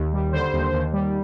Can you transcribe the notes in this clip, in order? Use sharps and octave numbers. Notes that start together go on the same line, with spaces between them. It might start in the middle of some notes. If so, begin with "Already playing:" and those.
Already playing: D#2
G3
D3 C5
D#2
D#2
G3